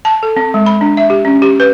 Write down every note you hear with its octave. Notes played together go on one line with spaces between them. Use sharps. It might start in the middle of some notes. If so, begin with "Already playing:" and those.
A5
A4
C4
G#3
B5
D4
E5
G4
C#4
G4
B4